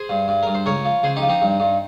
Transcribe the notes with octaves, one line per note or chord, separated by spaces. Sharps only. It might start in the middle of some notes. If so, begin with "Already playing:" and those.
Already playing: G#4 C5
G2
G2
G2 A#4
C5
C#2 A#4 C#5
F3
C#2 G#4 C5
D#4 G4
F3
C4 D#4
G2
G2